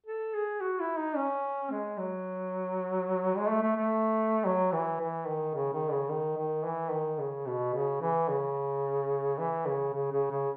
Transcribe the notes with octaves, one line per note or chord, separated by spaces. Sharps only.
A4
G#4
F#4
E4
D#4
C#4
G#3
F#3
G#3
A3
A3
A3
F#3
E3
E3
D#3
C#3
D#3
C#3
D#3
D#3
E3
D#3
C#3
B2
C#3
E3
C#3
E3
C#3
C#3
C#3
C#3